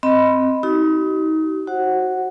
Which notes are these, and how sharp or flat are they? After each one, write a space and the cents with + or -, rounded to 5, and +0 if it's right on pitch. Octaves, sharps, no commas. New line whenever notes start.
C4 +0 D#5 +5 B5 +0
D#4 +30 G4 -45
F#4 +0 C5 +35 F#5 +0